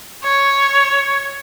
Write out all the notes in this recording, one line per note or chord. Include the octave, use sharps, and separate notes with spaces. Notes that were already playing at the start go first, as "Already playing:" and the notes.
C#5